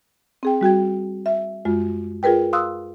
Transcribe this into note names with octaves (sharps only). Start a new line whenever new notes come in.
C4 G#4 G5
G3 F#4 G5 G#6
E5
F#2 G#3 F4
F4 G#4 A#4 B4 G5
F5 C6 D#6 E6 F#6